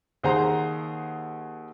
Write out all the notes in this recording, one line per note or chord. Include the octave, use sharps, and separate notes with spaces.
D#2 G#4 C5 F#5 A#5 C6